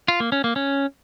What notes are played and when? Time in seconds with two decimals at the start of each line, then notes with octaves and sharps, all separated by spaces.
0.08 F4
0.20 A#3
0.32 C#4
0.44 A#3
0.56 C#4